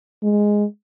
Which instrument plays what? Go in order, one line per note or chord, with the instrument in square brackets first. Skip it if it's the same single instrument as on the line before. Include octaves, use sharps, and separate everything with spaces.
[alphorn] G#3